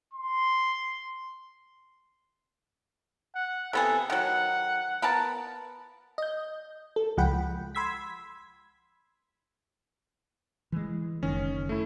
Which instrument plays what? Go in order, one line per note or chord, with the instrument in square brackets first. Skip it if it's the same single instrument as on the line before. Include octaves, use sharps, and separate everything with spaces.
[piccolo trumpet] C6
[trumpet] F#5
[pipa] C3 B3 G#4 [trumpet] A4
[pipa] D#3 F#3 [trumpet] F#5
[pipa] B3 A#4 A5
[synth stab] D#5 G6
A4
C#2 F3 G#3 F#5 G5 B5
B5 C6 E6 G#6 B6
[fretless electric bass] E3 G#3
[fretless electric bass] F#1 D#3 [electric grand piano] C#4
[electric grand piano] A3 E4